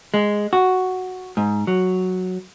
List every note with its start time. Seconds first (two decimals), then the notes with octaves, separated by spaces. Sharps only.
0.14 G#3
0.53 F#4
1.37 G#2
1.67 F#3